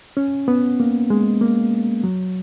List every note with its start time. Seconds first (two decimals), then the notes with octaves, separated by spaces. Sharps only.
0.17 C#4
0.48 B3
0.80 A#3
1.10 G#3
1.41 A#3
2.04 F#3